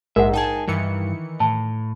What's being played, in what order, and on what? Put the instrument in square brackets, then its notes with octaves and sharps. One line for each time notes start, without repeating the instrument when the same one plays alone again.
[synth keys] A#1 G#2 G#3 [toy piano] A#4 F#5 [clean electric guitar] E5
[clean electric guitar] D#4 G#4 [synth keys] G5 A5
[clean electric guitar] G2 [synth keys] D#3 E3 C#7
[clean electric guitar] A2 [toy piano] A5